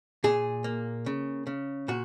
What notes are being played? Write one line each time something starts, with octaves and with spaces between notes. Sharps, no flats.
A#2 G#4
A#3
C#3
C#3
A#2 F#4